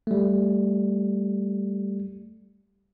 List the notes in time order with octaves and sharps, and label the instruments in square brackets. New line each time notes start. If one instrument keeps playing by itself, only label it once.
[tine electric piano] G3 A3